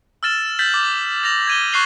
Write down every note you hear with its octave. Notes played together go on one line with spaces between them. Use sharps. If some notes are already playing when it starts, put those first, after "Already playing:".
E6 F6 A6 E7
G6 A6 B6 F#7
D6
A6 A#6 F7 F#7
G#6 D#7 G7
C#6 F#6 C7 F7 G7